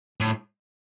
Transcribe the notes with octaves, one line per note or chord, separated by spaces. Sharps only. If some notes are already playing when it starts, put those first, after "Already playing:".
A2